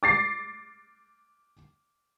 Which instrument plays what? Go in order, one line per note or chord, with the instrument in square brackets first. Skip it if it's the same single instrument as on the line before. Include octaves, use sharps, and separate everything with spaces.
[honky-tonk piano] D6 A6 C7